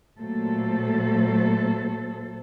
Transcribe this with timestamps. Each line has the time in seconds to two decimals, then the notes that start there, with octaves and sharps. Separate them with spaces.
0.20 A#2 F#3 A3 A4 C5